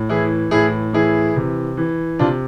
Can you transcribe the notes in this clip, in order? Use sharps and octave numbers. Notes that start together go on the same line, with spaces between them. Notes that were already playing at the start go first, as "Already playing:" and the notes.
Already playing: A2
E3 E4 G#4
A2 E4 G#4
E3 E4 G#4
C3
E3
C3 D4 F4